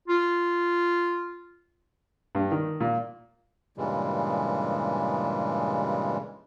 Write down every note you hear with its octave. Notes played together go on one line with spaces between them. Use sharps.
F4
G2
D#3
A#2
G2 A#2 C#3 E3 G3 G#3